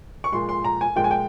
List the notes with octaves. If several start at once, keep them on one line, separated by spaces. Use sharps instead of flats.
C#6
A#2 F3 G#3 C6
C6
A#5
G#5
A#2 F3 G#3 G5
G#5
G5